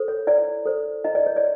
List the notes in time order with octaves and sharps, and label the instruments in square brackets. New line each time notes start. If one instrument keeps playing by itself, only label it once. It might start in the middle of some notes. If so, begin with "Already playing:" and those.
Already playing: [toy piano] A4 C5
C#5
E4 D5
A4 C5
E4 D#5
D5
C#5
D5